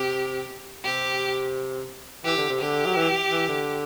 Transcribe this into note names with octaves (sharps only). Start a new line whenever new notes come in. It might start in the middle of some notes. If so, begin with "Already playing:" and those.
Already playing: C3 G4
C3 G4
E3 G4
D3
C3
D3 G4
F#3
E3
E3
D3